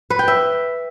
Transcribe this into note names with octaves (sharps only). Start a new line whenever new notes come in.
B4
G5
E5